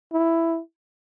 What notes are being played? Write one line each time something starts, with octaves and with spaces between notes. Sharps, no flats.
E4